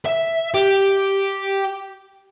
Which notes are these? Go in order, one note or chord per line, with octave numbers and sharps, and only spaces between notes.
E5
G4